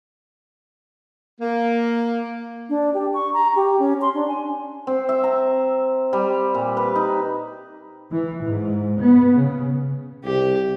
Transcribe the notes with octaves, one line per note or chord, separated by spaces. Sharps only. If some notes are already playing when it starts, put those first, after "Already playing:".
A#3
D4
G4
C#6
A#5
G4
C#4
C6
D4
G#5
C4
E5
A#5
G3
A#2
B4
D#4
E3
G#2
B3
C#3
C2 G4